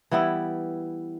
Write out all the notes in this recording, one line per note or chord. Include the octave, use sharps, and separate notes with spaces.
E3 G3 B3 E4